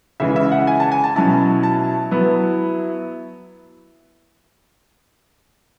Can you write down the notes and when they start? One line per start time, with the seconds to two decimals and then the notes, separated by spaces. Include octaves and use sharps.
0.20 C#3 E3 G#3 E5
0.36 E5
0.52 F#5
0.67 G#5
0.80 A5
0.92 G#5
1.04 A5
1.16 B2 F#3 C#4 E4 A5
1.63 A5
2.11 F#3 B3 E4